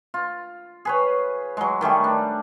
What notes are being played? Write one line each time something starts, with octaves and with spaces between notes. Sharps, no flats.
F4
G#4 B4 C#5
F#3 G#3
D#3 G3 A3 G#4
D4